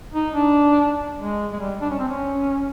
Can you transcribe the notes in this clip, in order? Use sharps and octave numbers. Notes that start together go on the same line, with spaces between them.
D#4
D4
G#3
G#3
G3
D4
C#4
C4
C#4